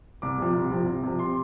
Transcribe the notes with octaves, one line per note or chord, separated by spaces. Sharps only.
C2 D6
C3 F3
C2
C3 F3
C2
C3 F3
C6